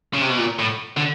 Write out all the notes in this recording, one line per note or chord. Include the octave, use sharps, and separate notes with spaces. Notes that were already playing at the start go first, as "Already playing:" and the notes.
C#3
C3
B2
A#2
A2
D3